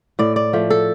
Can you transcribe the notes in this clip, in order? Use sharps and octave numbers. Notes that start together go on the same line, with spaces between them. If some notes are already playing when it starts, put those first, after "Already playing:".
A2 D5
D5
F3 A3
A4